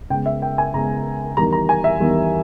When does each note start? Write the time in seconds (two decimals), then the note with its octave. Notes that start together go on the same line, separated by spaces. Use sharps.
0.10 C#3 G#3 B3 G5
0.26 E5
0.42 G5
0.58 G#5
0.74 C#3 G#3 B3 A#5
1.37 E2 D#3 G3 A#5
1.53 A#5
1.69 G#5
1.84 E5
2.00 E2 D#3 G3